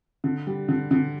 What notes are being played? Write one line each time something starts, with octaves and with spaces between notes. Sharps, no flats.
D3
G3
D3
D3